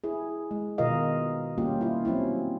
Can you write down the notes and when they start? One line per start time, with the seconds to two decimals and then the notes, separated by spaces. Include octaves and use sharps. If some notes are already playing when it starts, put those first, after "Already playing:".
0.04 E4 G#4
0.51 G#3
0.78 B2 D#3 F4 A#4 D#5 F5
1.58 G3 A#3 C#4 F4 G4
1.81 E4 F4
2.05 F#3 C4 C#4 E4